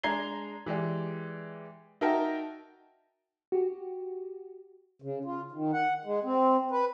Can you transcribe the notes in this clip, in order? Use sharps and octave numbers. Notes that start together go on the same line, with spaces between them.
G#3 D4 A#5 G#6 C7 G7
E3 G#3 G4 D5
D#4 F#4 A#4 E5 G5 A5
F#4 G4
C#3
F4
D#3
F#5
G#3
C4
B4